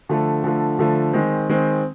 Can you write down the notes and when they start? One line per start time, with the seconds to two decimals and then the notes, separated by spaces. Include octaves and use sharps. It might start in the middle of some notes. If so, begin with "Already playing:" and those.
0.09 D3 F3 A3
0.44 D3 F3 A3
0.79 D3 F3 A3
1.13 D#3 G#3 C4
1.49 D#3 G#3 C4